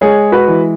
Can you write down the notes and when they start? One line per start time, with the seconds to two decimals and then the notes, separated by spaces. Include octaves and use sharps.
0.01 G#3 G#4 C#5
0.32 F#4 B4
0.48 E3